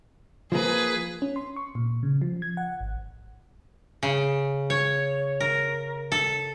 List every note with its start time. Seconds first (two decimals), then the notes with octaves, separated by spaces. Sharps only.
0.52 F3 A#3 G#4 B4
1.22 C#4
1.36 C6
1.56 C#6
1.75 A#2
2.03 C#3
2.22 F3
2.42 G#6
2.57 F#5
2.80 G#1
4.03 C#3
4.70 C#5
5.40 A#4
6.12 A4